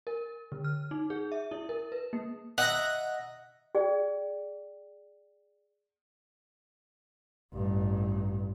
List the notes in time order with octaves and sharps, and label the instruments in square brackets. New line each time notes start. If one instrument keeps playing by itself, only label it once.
[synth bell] A#4
D3
F6
D#4
G#4
E5
E4
A#4
B4
A#3
[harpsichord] D#5 E5 A#5 [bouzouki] F#5
[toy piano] G#4 D5 G5
[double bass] A1 G2